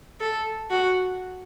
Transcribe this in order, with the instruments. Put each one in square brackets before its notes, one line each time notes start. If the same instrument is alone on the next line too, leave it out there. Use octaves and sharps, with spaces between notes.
[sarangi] A4
F#4